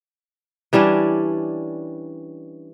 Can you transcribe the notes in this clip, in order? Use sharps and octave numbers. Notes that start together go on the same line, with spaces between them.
E3 G3 C#4 D4